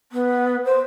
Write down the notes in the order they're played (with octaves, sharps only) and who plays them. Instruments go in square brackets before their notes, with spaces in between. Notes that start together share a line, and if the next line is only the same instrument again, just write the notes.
[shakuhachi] B3
C5